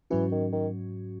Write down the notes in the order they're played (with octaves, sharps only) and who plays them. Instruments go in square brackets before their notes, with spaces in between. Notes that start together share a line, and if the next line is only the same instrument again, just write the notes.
[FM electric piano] G#2 F#3 C#4 F#4 [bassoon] E3
[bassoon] D#3
D#3